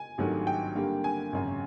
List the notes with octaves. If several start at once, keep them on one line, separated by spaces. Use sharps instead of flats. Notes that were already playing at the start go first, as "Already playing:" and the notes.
Already playing: G#5
G#1 G2 D#3 F#3 A3
G5
G2 D3 G3 A#3
G#5
G#1 F#2 C#3